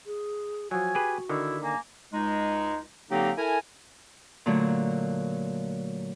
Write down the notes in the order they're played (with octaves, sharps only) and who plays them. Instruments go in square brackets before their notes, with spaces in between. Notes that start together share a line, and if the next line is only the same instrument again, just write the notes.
[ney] G#4
[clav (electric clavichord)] F3 F#3 [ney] F#4 [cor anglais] G#5
[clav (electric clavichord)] G4 G#4 B4
[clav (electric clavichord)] D3 D#3 [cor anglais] E4
[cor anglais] A#3 [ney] G#5
[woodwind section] C#2 G#3 D#4
D3 F#3 A#3 C4 D#4 G4
E4 A4 A#4 G#5
[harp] A#2 D3 F#3 A3